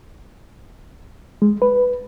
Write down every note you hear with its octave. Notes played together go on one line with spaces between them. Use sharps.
G#3
B4